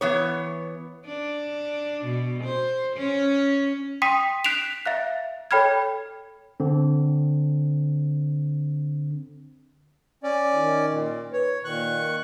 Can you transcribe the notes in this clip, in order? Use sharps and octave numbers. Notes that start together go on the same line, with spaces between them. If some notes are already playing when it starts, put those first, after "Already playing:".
E3 B3 C#5
D4
B2
C5
C#4
G5 C6 D#6 B6 D#7
F#6 B6 C7 D7 E7 F7
E5 F5 F#6
A4 C#5 G5 B5 F6 G#6
D3 C4
C#4 D5
D#3
A#2
B4 C#5
A#2 D#3 C#6 F#6